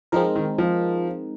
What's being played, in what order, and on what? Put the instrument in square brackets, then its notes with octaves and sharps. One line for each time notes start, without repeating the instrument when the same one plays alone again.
[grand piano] F3 [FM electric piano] G#3 C4 D#4 A#4
[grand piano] D#3
F3